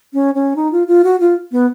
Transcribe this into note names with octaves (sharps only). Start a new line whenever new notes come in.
C#4
C#4
D#4
F4
F4
F#4
F4
B3